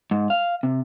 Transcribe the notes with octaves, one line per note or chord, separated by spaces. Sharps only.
G#2
F5
C3